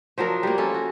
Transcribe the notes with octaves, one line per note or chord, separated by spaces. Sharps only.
F3 F#3 D4 A#4
G3 A#3
C#4 F4 A4
F#4